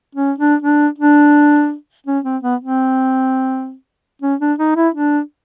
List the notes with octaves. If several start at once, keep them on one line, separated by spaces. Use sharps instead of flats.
C#4
D4
D4
D4
C#4
C4
B3
C4
C#4
D4
D#4
E4
D4